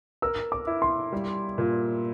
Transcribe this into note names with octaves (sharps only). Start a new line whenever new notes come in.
A#4 E6
D6
E4
C6
G3
A#2